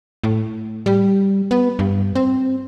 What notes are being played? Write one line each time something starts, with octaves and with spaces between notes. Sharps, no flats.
A2
G3
B3
G2
C4